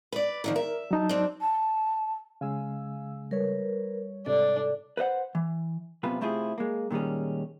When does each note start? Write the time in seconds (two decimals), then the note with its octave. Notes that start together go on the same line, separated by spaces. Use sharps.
0.12 B4 D5
0.44 D3 D#3 F3
0.56 A#4 E5
0.91 F#3 D#4 A5
1.09 C4 D4
1.41 A5
2.41 C#3 G#3 F5 G#5 E6
3.31 G3 A#4 B4 C#5
4.26 G#2 C3 D4 A4
4.97 B4 C5 D#5 F#5
5.35 E3
6.03 F#2 C3 B3 F4 B4
6.21 C3 A3 C4 E4 F4 G#4
6.58 G#3 A#3
6.91 A#2 D#3 G3 G#3 C#4